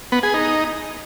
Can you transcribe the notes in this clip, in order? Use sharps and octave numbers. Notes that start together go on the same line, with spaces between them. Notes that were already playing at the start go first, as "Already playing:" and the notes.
B3
G#4
D#4